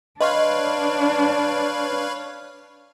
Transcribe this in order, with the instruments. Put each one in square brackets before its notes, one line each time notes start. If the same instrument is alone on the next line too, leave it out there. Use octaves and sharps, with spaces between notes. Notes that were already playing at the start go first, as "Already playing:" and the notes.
[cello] D4 [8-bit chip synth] B4 C#5 F5 [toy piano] D#5 C6